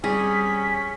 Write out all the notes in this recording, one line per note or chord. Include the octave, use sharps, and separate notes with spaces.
G3 C4 C#4 G4 G#4 B6